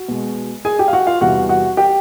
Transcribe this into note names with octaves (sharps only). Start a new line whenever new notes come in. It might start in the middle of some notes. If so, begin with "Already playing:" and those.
Already playing: F#4
B2 G#3
G#4 G#5
G4 G5
F5
F#4 F#5
F4 F5
E2 C3 E3 G3 F#4 F#5
F#4 F#5
G4 G5